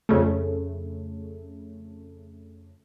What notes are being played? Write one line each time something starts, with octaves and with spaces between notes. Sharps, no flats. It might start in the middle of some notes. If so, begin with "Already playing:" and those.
F2 C#3 A3